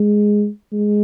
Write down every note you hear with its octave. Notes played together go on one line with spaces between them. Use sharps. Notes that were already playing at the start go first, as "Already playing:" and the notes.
Already playing: G#3
G#3